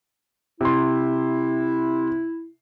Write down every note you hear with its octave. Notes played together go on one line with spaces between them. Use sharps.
C3 E4 C6